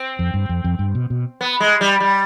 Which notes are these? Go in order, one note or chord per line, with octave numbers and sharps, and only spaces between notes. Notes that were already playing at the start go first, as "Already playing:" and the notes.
Already playing: C4
F2
G2
F2
F2
G2
B2
B2
B3
G#3
G3
G3